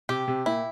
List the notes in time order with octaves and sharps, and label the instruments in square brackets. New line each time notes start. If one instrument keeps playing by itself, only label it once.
[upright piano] C3 [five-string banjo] G4
[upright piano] C3
[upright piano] A#2 [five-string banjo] E4